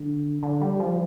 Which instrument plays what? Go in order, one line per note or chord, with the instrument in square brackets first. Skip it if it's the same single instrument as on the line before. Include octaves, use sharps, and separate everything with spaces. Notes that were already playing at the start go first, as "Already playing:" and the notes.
Already playing: [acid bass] D3
D3
G3
F3